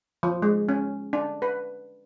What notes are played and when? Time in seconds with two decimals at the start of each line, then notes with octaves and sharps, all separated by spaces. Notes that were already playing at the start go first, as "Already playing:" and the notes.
0.23 F3
0.42 G#3
0.69 C#4
1.13 D4
1.42 B4